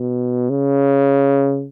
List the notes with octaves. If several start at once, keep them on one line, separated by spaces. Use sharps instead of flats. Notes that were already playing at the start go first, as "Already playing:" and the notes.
Already playing: B2
C#3